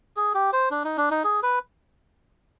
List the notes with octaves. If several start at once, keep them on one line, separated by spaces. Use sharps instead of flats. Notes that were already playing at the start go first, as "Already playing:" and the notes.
G#4
G4
C5
D4
D#4
D4
D#4
G#4
B4